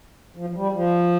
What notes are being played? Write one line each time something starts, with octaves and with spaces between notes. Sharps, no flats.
F3
F3
G3
F3